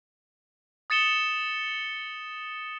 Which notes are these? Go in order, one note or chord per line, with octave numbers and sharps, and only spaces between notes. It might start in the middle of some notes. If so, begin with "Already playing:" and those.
D#6 A6 C#7 E7 G7